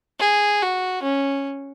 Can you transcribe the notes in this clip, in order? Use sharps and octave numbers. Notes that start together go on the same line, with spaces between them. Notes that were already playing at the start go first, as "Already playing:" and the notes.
G#4
F#4
C#4